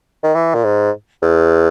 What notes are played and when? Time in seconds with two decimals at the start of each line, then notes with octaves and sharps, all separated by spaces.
0.24 D#3
0.35 E3
0.55 A#2
0.65 G#2
1.23 E2